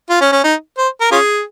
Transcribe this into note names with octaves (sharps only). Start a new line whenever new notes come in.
F4
C#4
C#4
D#4
C5
A#4
C#4 F4 G#4